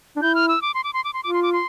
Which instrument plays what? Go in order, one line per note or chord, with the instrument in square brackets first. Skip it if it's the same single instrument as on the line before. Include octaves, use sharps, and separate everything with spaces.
[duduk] D4
[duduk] E4 [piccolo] G6
[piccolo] F6
E6
D6
C6
D6
C6
D6
C6
[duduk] F4 [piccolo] D6
[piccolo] C6
D6
C6